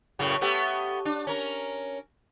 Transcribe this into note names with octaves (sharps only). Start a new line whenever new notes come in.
F#2 A2 C#3
A3 B3 G4
D4
C#4 A#4